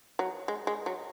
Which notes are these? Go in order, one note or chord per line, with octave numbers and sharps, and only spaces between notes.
F#3
G#3
G#3
F#3